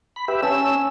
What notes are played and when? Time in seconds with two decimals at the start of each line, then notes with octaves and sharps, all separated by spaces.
0.16 B5
0.28 G4 B4 E5
0.42 C#4 G#5 A5 E6
0.75 C#4